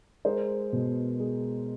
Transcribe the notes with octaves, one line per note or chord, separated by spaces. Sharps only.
G#3 A#4 C5
B2
G#3